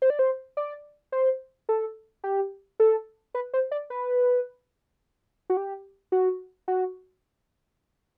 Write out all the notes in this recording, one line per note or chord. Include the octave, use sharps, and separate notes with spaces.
C5
D5
C5
D5
C5
A4
G4
A4
B4
C5
D5
B4
F#4
G4
F#4
F#4